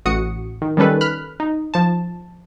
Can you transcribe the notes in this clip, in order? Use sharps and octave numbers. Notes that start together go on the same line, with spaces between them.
A1 F#4 D#6 C#7
D#3
D#3 G3 C#4 A4 B4
B5 F6 F#6
D#4
F3 A5